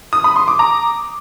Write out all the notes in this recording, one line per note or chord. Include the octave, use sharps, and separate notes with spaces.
D#6
B5
C6
D6
A#5